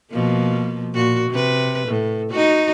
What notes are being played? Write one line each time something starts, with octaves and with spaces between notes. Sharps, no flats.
B2 F3 A#3
A#2 F#4
C3 B4
A2
D#4 F#4